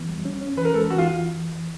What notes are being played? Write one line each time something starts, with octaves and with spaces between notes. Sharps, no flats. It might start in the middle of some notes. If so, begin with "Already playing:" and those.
Already playing: E3 B3
G3
C#4
C#4
E3 B4
A#4
G#3 A4
E3 F#4
F4